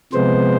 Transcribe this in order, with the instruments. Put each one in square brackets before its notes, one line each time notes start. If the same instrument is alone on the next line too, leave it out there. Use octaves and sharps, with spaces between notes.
[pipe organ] C3 F3 G#3 B3 C5